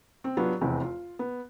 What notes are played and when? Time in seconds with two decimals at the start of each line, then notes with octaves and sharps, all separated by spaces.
0.24 C4
0.37 F#3 B3 D4 F4 G4
0.61 F1 E2 C4 E4
0.82 F4
1.19 B3